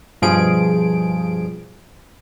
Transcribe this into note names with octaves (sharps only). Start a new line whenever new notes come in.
G2 B2 F3 G#4 D7